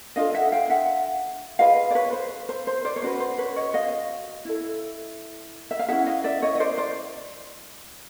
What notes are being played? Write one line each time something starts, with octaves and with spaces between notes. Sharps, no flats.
D4 F4 A4 D#5 F5
E5 F#5
F5 G5
E5 F#5
F4 G#4 B4 D#5 F5
D5
B4 C#5
C5
C5
C5
C5 D5
C#5
C#4 F#4 B4 C5 D5
C5
B4 C#5
C#5 D#5
D#5 F5
E4 A4
E5
F5
C#4 E4 G#4 E5 F#5
D#5 F5
D5 E5
C#5 D#5
D#5
C5 D5
C5 D5